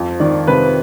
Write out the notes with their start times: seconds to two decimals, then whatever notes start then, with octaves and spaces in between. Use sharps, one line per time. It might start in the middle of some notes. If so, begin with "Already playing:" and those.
Already playing: F2
0.20 D#3 D5
0.47 C3 B4